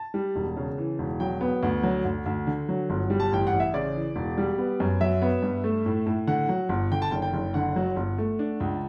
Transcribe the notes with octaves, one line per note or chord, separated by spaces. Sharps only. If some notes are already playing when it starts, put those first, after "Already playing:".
Already playing: A5
G3
E1
C#3
E3
E1
F#3 G5
B3
D2
F#3
D2
D2
D3
F#3
G1
G3
A5
A1 G5
F#5
A1
E5
C#3 D5
E3
E1
G3
B3
F#2
F#3 E5
B3
G2
A3
A2
A2
D3 F#5
F#3
G1
D3 G5
A5
F#1 G5
G5
F#1
D3 F#5
F#3
G1
A3
D4
C#2